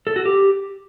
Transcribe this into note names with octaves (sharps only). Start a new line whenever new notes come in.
A4
F#4
G4